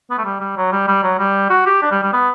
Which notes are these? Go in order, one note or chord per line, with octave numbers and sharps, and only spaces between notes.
B3
A3
G3
G3
F#3
G3
G3
F#3
G3
F#4
G4
D4
G3
G3
B3